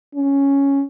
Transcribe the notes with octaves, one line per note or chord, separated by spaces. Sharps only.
C#4